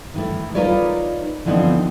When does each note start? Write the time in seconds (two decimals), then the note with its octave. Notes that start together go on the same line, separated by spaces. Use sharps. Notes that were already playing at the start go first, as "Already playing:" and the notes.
0.14 D#3 E3 A3
0.55 D#4 F4 A#4 B4 C#5 D5
1.45 D3 E3 F3 B3 C4 D#4